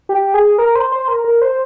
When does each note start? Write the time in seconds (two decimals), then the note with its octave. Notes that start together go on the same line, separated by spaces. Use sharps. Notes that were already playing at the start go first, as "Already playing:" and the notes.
0.09 G4
0.34 G#4
0.58 A#4
0.75 C5
0.92 C5
1.08 A#4
1.24 A#4
1.41 C5